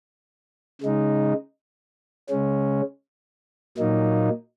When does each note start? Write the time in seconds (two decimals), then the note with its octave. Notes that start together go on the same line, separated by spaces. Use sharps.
0.82 C#3 G#3 D#4
2.30 C#3 G#3 C#4
3.78 A#2 F#3 A#3 D#4